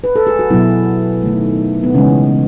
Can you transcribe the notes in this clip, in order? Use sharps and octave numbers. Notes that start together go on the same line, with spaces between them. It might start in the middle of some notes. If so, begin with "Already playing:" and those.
B4
A4
G#4
F#4
B2 F#3 B3 E4
D#3 A3
B3
C#3 E3 G#3 C#4